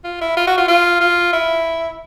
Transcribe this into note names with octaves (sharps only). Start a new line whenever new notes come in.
F4
E4
F4
F#4
F4
F4
F4
E4